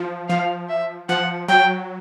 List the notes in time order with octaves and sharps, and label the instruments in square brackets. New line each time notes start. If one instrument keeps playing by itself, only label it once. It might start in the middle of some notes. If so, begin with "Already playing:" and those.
Already playing: [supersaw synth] F3
[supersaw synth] F3 [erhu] F5
[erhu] E5
[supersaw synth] F3 [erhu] F#5
[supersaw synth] F#3 [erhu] G5